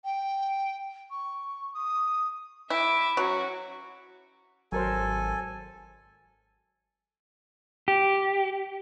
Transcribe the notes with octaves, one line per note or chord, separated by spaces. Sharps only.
G5
C#6
D#6
E4 E5 D6
F#3 C#4 F#4
G#1 F#3 A4 A#4 C5 G#5
G4